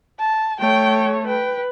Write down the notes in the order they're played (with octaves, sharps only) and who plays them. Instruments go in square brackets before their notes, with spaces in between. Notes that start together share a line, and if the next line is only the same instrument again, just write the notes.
[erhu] A5
[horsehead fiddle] A3 C#5 [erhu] G5
[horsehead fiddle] B4 [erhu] G5